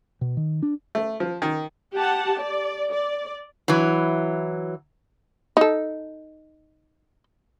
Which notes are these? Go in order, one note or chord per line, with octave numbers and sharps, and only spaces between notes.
B2
D#3
D4
A3
F3
D#3
G4 F#5 A5
D5
D5
E3 F#3
D#4 A4